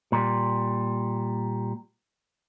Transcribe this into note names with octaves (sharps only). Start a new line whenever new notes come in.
A#2 G3